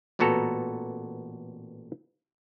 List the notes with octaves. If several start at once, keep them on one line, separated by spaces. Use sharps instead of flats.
A1 A#2 B3 F#4 A4 A#5